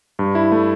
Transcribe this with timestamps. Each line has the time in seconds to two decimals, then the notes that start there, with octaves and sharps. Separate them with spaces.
0.19 G2
0.35 E4
0.52 A3